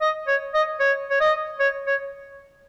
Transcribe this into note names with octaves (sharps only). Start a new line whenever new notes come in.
D#5
C#5
D#5
C#5
C#5
D#5
C#5
C#5